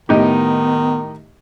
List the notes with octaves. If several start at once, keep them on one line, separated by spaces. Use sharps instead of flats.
A2 D#3 B3 D#4 G4